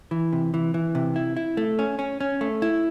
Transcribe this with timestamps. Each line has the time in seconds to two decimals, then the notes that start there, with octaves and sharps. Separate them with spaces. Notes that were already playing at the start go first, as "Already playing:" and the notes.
0.11 E3
0.33 C3
0.54 E3
0.74 E3
0.95 C3
1.16 E4
1.37 E4
1.57 A3
1.79 C#4
1.99 C#4
2.20 C#4
2.41 A3
2.62 E4